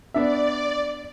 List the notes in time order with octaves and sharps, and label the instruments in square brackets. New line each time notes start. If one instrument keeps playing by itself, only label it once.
[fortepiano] B3 D4 E5 [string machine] D5